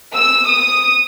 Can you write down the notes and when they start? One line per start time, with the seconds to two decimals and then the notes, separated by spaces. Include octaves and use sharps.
0.14 E6
0.47 D#6